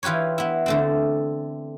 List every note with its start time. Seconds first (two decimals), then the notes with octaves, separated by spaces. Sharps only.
0.03 E3 F4 G4 B4 C#5
0.38 B3 E4
0.66 D3 A3 C4